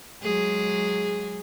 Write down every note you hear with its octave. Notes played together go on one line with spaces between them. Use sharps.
F#3 G#3 G#4